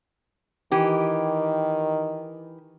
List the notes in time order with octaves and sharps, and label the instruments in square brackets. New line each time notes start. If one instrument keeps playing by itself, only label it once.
[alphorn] D#3 [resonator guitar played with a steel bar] E3 G4